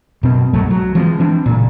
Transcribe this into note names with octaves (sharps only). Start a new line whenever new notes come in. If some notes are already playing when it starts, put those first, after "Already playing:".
F#2 B2 C4
C2 G#2 F#3 A3
F#3
E3 F3 G#3 C4
E3 C4 D4
F#1 A#2